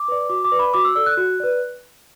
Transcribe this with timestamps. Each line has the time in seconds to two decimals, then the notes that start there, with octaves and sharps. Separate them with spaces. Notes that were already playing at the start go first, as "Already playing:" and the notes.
Already playing: D6
0.08 B4 D5
0.30 F#4 D6
0.45 D6
0.52 B4 D5
0.59 B5
0.74 F#4 D6
0.85 E6
0.96 A4 D5 E6
1.06 F#6
1.17 F#4
1.40 B4 D5